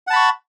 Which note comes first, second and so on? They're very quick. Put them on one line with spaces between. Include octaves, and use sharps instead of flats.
F#5 A5 B5 C#6